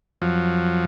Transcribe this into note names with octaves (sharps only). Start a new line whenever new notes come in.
F2 F3 F#3